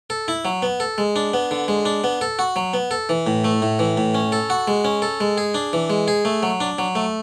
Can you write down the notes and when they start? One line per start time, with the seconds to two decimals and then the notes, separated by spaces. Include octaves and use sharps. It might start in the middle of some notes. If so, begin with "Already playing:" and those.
0.10 A4
0.28 E4
0.45 F#3
0.62 B3
0.80 A4
0.98 G#3
1.16 D4
1.34 B3
1.51 D3
1.68 G#3
1.85 D4
2.04 B3
2.21 A4
2.39 F#4
2.56 F#3
2.74 B3
2.91 A4
3.09 E3
3.27 A2
3.44 A3
3.62 A2
3.79 E3
3.97 A2
4.15 C#4
4.32 A4
4.50 F#4
4.68 G#3
4.85 C#4
5.02 A4
5.21 G#3
5.38 G#4
5.54 D4
5.73 E3
5.90 G#3
6.08 G#4
6.25 A3
6.43 F#3
6.61 D4
6.78 F#3
6.95 A3